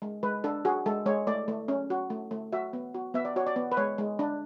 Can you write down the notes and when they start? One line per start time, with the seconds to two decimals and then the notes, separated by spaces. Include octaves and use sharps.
0.02 G#3
0.23 G#3 B4
0.44 D4 A4
0.65 F#4 G#4
0.86 G#3 A4
1.06 G#3 C#5
1.27 A3 D5
1.48 A3
1.68 C#4
1.90 F#4
2.10 A3
2.31 A3
2.53 F#4 E5
2.73 B3
2.94 F#4
3.14 B3 E5
3.25 D5
3.36 F#4 C#5
3.47 D5
3.56 B3
3.72 B4
3.77 G#3 C#5
3.98 G#3
4.19 D4